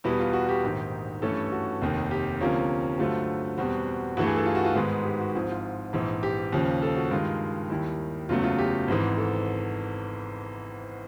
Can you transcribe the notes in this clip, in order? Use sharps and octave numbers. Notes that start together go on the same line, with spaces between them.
E2 B2 G3 B3 E4
F4
F#4
G4
A#1 G#2 D#3
G2 E3 A3 C#4 A4
F#4
F1 D#2 D#3
G4
D2 C3 F3 A#3 C#4
G2 D3 F#3 A3 C4 F4
E2 B2 G3 C4 F#4
G2 E3 A3 F#4
G#4
A4
F4
F#4
F4
G#2 D#3 G#3 B3
G4
F#4
G#1 G#2 F3 E4
F4
A#1 G#2 E3
G4
D#2 C#3 F3
A4
F#4
G2 D#3 G#3 F4
D#2 D#3 G3 E4
F#1 E2 C#3 F#3 A3 F4
F4
G4
G#1 G#2 E3
A4